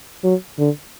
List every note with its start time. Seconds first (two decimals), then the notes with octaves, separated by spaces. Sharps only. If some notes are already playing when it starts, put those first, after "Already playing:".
0.24 F#3
0.59 D3